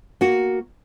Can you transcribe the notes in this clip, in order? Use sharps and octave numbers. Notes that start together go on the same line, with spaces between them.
A#3 F#4